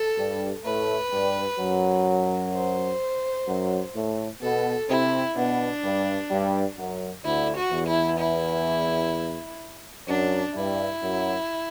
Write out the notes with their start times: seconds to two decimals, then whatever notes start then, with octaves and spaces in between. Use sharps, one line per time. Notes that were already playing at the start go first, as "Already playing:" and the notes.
Already playing: A4
0.18 G2 G3
0.65 A2 A3 B4
1.12 G2 G3
1.59 F#2 F#3
2.53 C5
3.48 F#2 F#3
3.95 A2 A3
4.42 B2 B3 A4
4.89 C3 C4 E4
5.36 B2 B3 D4
5.84 G2 G3
6.31 G2 G3
6.78 F#2 F#3
7.25 D2 D3 E4
7.57 F#4
7.72 E2 E3
7.87 E4
8.20 E4
10.08 F#2 F#3 D4
10.55 G2 G3 E4
11.02 F#2 F#3